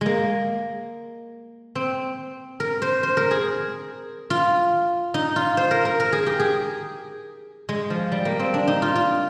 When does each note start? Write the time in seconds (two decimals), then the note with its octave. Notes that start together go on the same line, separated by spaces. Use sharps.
0.01 G#3 A#3
1.75 C4
2.60 A#4
2.82 C5
3.03 C5
3.17 A#4
3.31 G#4
4.30 F4
5.14 D#4
5.36 F4
5.57 C5
5.71 A#4
5.85 A#4
6.00 A#4
6.12 G#4
6.26 G4
6.40 G#4
7.69 G#3
7.90 F3
8.12 G3
8.25 A#3
8.39 C4
8.54 D4
8.67 D#4
8.82 F4
8.95 F4